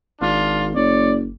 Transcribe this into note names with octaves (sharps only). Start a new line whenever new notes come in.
G#1 D4 F4
F#1 C#5 D5